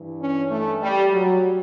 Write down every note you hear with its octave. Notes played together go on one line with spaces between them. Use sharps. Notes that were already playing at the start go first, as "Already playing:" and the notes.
Already playing: G2 E3
C#4
A3
G3
F#3